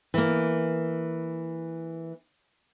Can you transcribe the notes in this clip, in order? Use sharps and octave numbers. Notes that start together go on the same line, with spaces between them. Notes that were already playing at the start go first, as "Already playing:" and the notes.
E3 A#3